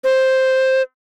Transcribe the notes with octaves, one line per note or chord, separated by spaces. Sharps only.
C5